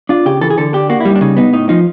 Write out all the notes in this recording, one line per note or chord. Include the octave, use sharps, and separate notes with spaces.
D4 F4
C#3 G4
E3 A4
G#4
D3 A4
D4 G4
A#3 F#4
E4
G3
D#4
D4
C#3 D#4
B3 D#4
A2 D#4
F3 D#4